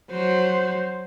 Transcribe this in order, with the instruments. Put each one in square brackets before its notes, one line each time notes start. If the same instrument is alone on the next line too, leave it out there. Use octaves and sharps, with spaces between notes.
[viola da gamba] F#3 [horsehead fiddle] C5